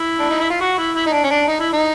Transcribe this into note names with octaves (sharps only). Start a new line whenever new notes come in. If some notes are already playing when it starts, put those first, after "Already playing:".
Already playing: E4
D4
D#4
E4
F4
F#4
E4
E4
D#4
D4
C#4
D4
D#4
E4
D#4